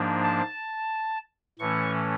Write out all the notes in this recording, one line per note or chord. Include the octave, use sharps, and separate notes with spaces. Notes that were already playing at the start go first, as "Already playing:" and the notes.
Already playing: G#2 F3 A#3 D4
A5
A2 E3 A3 C#4 C#6